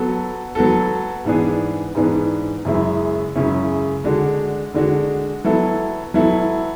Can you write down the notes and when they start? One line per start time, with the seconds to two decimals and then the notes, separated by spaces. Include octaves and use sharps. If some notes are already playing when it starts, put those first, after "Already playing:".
Already playing: F#3 B3 F#4 A4
0.55 F#3 B3 F#4 A4
1.25 G#2 E3 B3 D4 G#4
1.95 G#2 E3 B3 D4 G#4
2.65 F#2 C#3 G#3 C#4 E4
3.35 F#2 C#3 G#3 C#4 E4
4.04 D3 G#3 D4 F#4
4.74 D3 G#3 D4 F#4
5.44 F#3 B3 E4 A4
6.14 F#3 B3 E4 A4